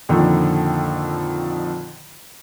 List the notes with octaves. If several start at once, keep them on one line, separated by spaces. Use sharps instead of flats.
F2 A#2 D3 D#3 F3